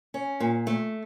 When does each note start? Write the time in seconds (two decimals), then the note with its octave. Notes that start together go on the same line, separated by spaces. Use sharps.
0.14 C#4
0.40 A#2
0.67 A3